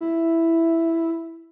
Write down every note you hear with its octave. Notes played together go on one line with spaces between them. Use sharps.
E4